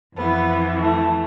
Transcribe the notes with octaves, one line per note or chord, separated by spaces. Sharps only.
F2 E3 B3
A3